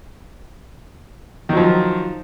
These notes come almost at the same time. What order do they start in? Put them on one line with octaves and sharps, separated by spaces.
D#3 F#3 F3